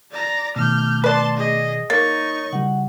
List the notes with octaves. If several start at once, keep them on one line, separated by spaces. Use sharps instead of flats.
D5 A#5
B2 D#3 A3 D6 F6 G6
B4 D5 A5 C6
G#4 D#5
A#3 D#4 C#5 C#6 A6
C#3 G3 F#5